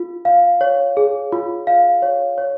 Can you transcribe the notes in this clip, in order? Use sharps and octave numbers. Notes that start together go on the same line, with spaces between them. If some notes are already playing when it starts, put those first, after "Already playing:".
Already playing: F4
F5
C#5
G#4
F4
F5
C#5
C#5